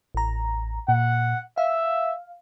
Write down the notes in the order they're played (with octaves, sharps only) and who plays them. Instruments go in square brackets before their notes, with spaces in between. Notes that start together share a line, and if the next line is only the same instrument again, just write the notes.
[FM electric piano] A1 A#5
[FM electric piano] A#2 [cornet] F#5
[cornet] E5 [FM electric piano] F5